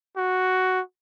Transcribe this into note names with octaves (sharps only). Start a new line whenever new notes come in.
F#4